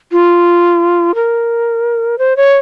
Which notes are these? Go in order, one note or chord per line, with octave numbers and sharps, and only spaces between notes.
F4
A#4
C5
C#5